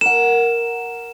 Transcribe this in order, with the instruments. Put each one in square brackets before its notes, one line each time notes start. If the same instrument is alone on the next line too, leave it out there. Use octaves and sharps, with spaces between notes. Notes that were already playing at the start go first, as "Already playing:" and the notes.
[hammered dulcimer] A#4 F#5 [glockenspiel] E7